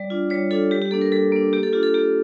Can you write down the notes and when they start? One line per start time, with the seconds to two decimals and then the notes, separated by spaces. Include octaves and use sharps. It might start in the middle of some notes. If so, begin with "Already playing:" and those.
Already playing: G3 D5
0.10 D4 F4
0.30 G3 C#5
0.51 D4 F4 A4
0.71 G3 G4
0.82 G4
0.91 A#3 D4 A4
1.01 A#4
1.12 G3 A4
1.32 A#3 D4
1.53 A#3 G4
1.63 A4
1.73 D4 F4 G4
1.83 A4
1.94 A#3 G4